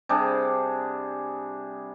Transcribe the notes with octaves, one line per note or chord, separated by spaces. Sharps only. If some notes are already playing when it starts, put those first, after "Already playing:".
C3 G3 D4 G#4